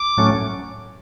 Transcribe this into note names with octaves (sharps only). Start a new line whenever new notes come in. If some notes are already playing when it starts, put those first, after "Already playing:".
Already playing: D6
A2 F#3 A3 C#4